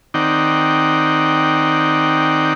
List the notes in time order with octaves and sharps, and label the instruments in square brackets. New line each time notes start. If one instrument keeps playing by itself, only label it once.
[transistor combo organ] D#3 C4 D#4 D5 F#5 G5